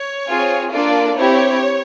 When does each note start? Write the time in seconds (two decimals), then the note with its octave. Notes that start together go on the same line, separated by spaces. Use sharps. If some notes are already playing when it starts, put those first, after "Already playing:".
Already playing: C#5
0.28 C4 F4 G#4
0.72 A#3 D4 F4 A4 D5
1.18 C4 E4 G4 C#5